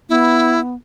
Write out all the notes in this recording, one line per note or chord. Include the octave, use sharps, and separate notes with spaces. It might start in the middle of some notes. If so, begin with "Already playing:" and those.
B3 E4